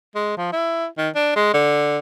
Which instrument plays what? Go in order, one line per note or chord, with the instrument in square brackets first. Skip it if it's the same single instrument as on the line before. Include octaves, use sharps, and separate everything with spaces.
[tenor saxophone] G#3
F3
E4
D#3
D4
G#3
D3